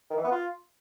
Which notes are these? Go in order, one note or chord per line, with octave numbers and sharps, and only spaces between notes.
D#3
E3
B3
F4